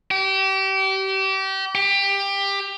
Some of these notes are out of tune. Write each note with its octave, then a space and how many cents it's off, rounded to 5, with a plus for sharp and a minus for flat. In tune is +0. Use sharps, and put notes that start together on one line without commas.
G4 -30
G4 +20